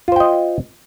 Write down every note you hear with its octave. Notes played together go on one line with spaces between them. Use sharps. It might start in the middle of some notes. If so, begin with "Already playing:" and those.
F4 C5 D#5 G5